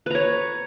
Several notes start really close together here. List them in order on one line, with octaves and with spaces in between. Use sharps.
B4 A#5 C#5